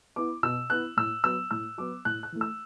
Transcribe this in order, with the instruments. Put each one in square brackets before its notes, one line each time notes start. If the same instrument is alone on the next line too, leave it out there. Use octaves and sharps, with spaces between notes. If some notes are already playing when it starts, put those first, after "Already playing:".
[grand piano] B3 E4 D6
B2 E6
B3 E4 F#6
A2 E6
F#3 B3 E6
A2 E6
F#3 B3 D6
A2 F#6
F#6
E3 A3
E6